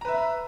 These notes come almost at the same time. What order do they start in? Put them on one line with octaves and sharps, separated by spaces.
A#5 B4 E5